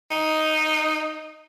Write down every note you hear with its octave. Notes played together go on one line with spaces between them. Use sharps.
D#4